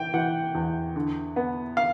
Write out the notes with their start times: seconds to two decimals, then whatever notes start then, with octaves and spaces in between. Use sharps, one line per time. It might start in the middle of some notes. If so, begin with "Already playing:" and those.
Already playing: E3 G5
0.14 E3 F#5
0.55 E2
0.96 D3
1.36 B3
1.77 F5